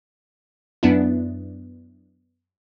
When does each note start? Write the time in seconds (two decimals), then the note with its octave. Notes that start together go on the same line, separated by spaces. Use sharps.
0.83 F#2 B3 D4 E4